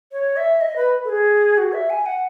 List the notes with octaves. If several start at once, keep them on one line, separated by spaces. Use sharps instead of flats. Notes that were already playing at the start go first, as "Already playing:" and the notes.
C#5
E5
D#5
B4
A4
G#4
F#4
E5
G#5
F#5